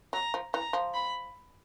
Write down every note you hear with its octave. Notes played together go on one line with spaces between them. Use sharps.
F#3 A#5
F3
E3 A#5
F3
B5